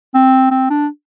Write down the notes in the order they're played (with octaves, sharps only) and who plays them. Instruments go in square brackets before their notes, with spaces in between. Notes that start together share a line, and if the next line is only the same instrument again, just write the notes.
[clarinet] C4
C4
D4